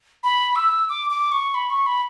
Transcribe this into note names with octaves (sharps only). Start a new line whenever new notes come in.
B5
E6
D6
D6
C#6
B5
C#6
B5